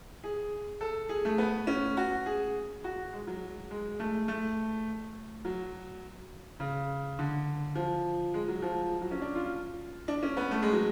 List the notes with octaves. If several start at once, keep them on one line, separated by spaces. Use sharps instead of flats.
G#4
A4
G#4
A3
B3
C#4
F#4
G#4
F#4
G#3
F#3
G#3
A3
A3
F#3
C#3
D3
F3
G#3
F#3
F3
F#3
C#4
D4
F4
D4
C#4
B3
A3
G#3
F#3